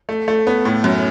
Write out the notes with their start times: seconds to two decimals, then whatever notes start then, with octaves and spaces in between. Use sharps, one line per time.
0.09 A3
0.28 A3
0.47 B3
0.65 A2
0.84 F#2